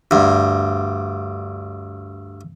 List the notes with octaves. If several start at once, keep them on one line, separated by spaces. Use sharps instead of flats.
D2 G2